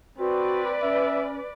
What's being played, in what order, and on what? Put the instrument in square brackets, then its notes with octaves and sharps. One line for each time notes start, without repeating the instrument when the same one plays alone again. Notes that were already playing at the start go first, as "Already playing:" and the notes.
[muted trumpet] C4 [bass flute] F#4 [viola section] B4 D5
[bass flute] C#4 [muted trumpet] E5